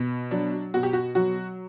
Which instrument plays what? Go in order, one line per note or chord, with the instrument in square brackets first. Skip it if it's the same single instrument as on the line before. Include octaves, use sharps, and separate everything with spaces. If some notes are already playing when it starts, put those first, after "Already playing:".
Already playing: [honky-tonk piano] B2
F#3 D4
B2 F#4
G4
F#4
F#3 F#4